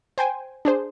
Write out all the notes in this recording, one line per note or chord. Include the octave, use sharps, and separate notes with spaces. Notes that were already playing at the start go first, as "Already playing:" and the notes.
C5 G5 G#5
D4 G#4 C5